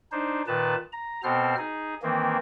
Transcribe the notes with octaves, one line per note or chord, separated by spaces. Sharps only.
D4 D#4 C5
A#2 D#3 B4 A5
A#5
B2 B3 C4 A4 C5 F6
D#4 G#4
D#3 E3 A#3 C4